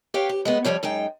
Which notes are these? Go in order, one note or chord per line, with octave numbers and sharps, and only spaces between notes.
G4 B4 C#5 F5 G5
G4
G#3 A3 B3
F2 G#2 F3 G3 C#5
F#2 G#3 D#4 G5